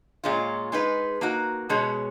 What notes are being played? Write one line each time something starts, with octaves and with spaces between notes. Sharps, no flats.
A#2 G#3 C#4 F4
G#3 D#4 G#4 B4
A#3 D#4 F#4
B2 G#3 C#4 G#4 C#5